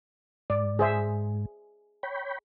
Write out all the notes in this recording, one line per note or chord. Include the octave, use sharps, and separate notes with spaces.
G#2 D5
G#4 C5 E5
C#5 G5 B5